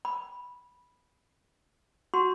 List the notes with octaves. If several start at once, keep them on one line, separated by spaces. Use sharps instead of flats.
B5
F#4 C6